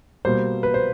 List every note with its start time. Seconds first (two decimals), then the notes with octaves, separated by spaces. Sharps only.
0.25 B2 G3 A#3 C5
0.63 B4
0.74 C5